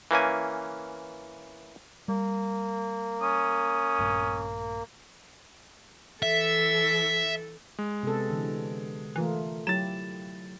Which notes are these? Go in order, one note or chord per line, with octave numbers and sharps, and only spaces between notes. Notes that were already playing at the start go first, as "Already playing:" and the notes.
E3 A#3 C#4 G#5
G3 A#3
C#4 D#6
A#1 G2
E3 A4 E5
G#3
C3 B3 A4
D3 E3
E3 A3 F4 A#4
F#3 E4 G4 A6 E7